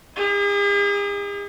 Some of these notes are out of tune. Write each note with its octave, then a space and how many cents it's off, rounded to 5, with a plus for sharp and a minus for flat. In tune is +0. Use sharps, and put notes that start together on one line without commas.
D#4 +25 G#4 -45